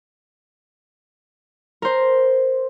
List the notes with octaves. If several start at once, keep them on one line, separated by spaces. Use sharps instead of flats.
A#4 C5